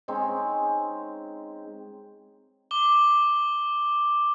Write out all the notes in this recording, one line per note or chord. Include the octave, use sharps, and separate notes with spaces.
G#3 C4 C#4 D#4
D6 G7